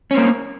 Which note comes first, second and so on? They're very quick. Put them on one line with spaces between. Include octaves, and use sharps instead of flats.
C#4 C4 A#3